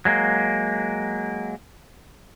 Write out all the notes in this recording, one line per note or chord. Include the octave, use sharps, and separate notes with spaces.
F#3 G#3 A#3